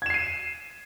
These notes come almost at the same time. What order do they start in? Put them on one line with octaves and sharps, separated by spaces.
G#6 E7 C7 D#7